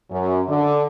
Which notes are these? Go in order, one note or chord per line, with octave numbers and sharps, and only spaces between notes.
F#2
D3